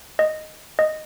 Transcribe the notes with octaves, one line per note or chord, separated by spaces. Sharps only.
D#5
D#5